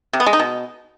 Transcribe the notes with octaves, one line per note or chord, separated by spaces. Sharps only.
C3
B3
G#3
D#4
B2